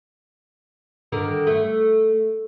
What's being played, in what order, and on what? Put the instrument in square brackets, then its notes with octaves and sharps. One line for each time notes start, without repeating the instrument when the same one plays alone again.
[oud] D3 D#3 A#4
A3